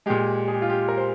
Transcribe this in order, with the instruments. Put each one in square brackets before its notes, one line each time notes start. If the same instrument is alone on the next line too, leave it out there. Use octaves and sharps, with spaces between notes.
[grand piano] A#2 G#3 G4
G#4
G4
F4
G4
A#4
C5